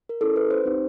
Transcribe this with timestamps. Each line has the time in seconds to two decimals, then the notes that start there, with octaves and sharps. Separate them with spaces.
0.09 A#4
0.21 C#4 E4 G#4 A4
0.36 B4
0.51 C5
0.65 C4 D#4 G4